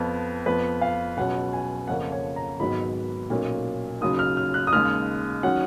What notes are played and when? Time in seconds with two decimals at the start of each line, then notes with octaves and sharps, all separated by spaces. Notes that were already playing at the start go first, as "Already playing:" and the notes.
Already playing: F2 F3 B3
0.46 F2 F3 B3 B4
0.81 F5
1.17 C#2 B2 F#3 C#4 F#5
1.53 G#5
1.88 F2 C#3 F3 A#3 C#4 F#5
2.12 C#5
2.36 A#5
2.60 G#1 G#2 D#3 F#3 B3 B5
3.30 B1 A#2 F#3 A#3 C#4
4.01 D#2 C#3 F#3 D#6
4.19 F6
4.37 F6
4.54 F#6
4.67 D#6
4.73 D#2 C#3 G#3 F6
5.43 D#3 F#3 C#4 F#5